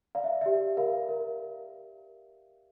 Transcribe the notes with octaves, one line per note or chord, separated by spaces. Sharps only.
D5 F5
E5
G4 E5
A#4 F5
A#4